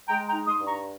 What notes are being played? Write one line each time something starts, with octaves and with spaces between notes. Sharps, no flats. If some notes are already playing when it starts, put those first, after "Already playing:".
G#3 G5 A#5
G5 A#5
D#4
C6 D#6
G2
A#5 C#6